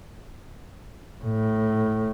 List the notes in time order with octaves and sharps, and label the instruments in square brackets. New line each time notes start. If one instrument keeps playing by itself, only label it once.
[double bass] A2